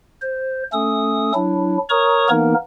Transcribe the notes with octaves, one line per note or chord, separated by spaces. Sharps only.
C5
A3 C#4 A4 D#6
F#3 D4 E4
A#4 C#5 A#5 C#6 D#6
E3 A#3 B3 D#4 A#4